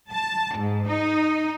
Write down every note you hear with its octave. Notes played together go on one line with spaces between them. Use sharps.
A5
G#2
D#4